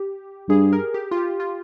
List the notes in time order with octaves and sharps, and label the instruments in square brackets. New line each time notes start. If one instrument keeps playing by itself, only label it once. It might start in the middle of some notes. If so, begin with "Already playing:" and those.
Already playing: [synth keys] G4
[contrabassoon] G2 [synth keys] G#4
[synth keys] A#4
G4
F4
G4
F4